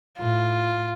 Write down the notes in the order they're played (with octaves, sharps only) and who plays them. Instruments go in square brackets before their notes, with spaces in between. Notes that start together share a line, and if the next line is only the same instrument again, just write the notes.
[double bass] A2 [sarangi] F4